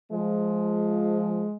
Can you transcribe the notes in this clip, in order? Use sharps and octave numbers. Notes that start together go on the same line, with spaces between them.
F3 G#3